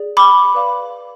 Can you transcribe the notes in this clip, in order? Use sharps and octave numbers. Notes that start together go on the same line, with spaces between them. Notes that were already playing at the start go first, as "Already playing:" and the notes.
Already playing: G#4 D5
B5 D6
B4 D5 F5